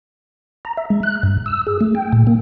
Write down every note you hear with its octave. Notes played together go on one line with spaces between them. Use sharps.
A#5
E5
G#3
F#6
G2
E6
G#4
A3
G5
A#2
A#3